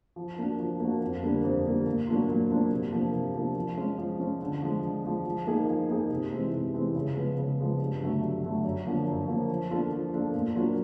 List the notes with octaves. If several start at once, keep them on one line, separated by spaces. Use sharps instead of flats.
F3
A#3 D4 F#4
F3
A#3 D4 F#4
F2
D3 G3 A#3 D4
F2
D3 G3 A#3 D4
A#2
F#3 A#3 D4 F4
A#2
F#3 A#3 D4 F4
C3
F3 A#3 D4
C3
F3 A#3 D4
F3
G#3 C#4
F3
G#3 C#4
D3
F3 G#3
D3
F3 G#3
F3
A#3 D#4 G#4
F3
A#3 D#4 G#4
C3
E3 G#3 C4
C3
E3 G#3 C4
C#3
F3 G#3 B3
C#3
F3 G#3 B3
G2
D3 F#3 A3
G2
D3 F#3 A3
F#2
D3 F3 A#3
F#2
D3 F3 A#3
F3
A#3 D4 F4 A4
F3
A#3 D4 F4 A4
A#2
F#3 A#3 D4 F4